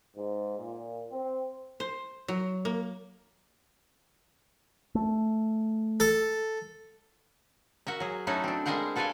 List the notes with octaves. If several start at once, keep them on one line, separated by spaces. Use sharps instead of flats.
G#2
A#2
C4
C5
F#3
A#3
A3
A4
F#4 A#4 E5
F#3 G#4
F#3 A3 C#4 D#4 E4 F#4
C4 D4
G3 G#3 G#4 A#4 C5 F#5
F#4 A4 B4 D5 F5 G#5